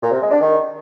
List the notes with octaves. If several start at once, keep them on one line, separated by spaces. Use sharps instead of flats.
A#2
C3
G#3
D4
D#3